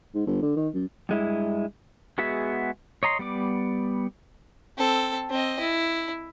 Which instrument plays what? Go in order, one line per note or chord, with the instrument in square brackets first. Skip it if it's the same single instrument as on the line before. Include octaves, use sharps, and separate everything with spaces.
[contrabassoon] G#2
G1
D3
D#3
F#2
[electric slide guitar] G2 G#3 E4
[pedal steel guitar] G#3 B3 F#4 G#4 E5
C#5 D#5 A#5 C6
G3 B3 D5 D6
[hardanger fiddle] C4 A4
C4 D#5
E4